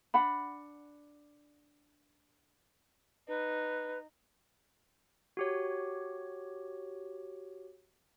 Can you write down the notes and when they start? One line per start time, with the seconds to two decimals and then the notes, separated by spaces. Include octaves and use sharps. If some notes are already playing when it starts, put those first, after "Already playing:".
0.14 D4 F#5 B5
3.28 D#4 B4
5.37 F#4 G4 C#5